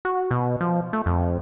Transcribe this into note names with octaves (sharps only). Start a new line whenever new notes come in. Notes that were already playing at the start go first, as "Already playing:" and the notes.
F#4
B2
F3
A3
F2